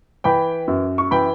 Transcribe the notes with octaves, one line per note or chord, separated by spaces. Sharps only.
E3 G5 B5
F#2
C#6
E3 G5 B5